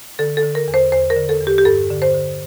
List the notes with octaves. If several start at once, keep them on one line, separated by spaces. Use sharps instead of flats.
D3 A4
A4
D3
A#4
E2
C5
E2 C5
A#4
D3
A4
E2
G4
G4
G2 A4
D3
C5
D3